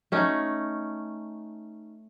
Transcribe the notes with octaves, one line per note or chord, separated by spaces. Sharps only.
A3 C#4 D#4